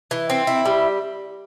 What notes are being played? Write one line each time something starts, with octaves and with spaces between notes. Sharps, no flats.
E3
C4
E4
G3